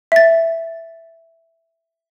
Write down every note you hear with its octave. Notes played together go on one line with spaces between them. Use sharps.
E5 A6